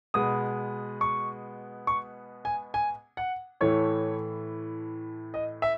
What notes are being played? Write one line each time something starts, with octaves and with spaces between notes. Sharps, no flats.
B2 G#3 B3 D#6
C#6
C#6
G#5
G#5
F#5
A2 E3 A3 C#5
D#5
E5